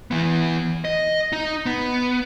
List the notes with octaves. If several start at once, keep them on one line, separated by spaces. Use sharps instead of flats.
E3 B3
D#5
D#4
B3